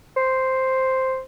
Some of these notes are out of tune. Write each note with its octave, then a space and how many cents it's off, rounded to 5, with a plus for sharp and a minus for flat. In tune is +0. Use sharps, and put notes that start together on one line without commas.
C5 +0